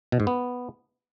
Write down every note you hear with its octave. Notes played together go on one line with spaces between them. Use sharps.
B2
G#2
B3